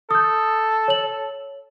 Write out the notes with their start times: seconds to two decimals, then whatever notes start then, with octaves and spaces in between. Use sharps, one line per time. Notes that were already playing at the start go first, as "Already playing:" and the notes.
0.11 A4 D#6 G6
0.88 C#5 F#7